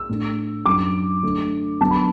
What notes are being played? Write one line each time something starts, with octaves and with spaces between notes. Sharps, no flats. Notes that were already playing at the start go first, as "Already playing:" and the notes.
Already playing: E6
A2 A3 D4
F#2 F#3 D4 D6
D3 A3 D4
D3 F#3 B3 D4 A5
B5